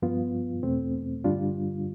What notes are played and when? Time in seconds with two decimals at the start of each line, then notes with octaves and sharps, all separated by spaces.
0.02 G2 F3 B3 F4
0.63 E2 B2 A3 C4
1.24 G2 D3 G3 D4 F4